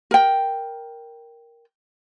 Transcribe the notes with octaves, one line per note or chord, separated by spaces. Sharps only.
A#4 G5